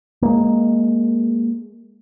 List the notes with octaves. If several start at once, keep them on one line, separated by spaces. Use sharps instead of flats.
G#3 A#3